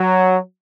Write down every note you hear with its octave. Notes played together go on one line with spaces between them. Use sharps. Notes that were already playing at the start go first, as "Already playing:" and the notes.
Already playing: F#3